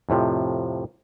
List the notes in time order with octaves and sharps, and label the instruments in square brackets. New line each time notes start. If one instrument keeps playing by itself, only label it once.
[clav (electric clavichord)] F2 A2 C3 F3